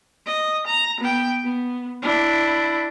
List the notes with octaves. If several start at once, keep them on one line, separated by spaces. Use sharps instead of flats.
D#5
A#5
B3 G5
B3
D4 E4